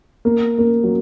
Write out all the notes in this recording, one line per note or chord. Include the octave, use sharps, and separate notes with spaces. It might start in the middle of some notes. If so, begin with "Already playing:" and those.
A#3
A#3
F#3